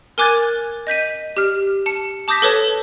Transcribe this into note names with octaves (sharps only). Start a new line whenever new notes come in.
A#4 G#5 D6 F#6 G#6 A6
D#5 G6 B6 D#7
G4 F6
A5 C#7
A5 D6 D#6 G6 A#6 B6
A4 B4 C#5 A5